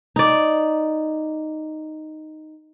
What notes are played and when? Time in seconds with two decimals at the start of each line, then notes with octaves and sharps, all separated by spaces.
0.16 D#4 D5